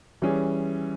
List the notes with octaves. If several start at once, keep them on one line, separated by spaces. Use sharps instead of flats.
E3 G3 C#4 G#4